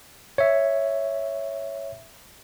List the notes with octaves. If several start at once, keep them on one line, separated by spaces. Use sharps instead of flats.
C#5 E5